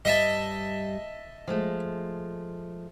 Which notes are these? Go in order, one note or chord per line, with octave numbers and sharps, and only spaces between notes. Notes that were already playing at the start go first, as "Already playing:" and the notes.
G2 G3 D#5 E5 A5
F3 G#3 A3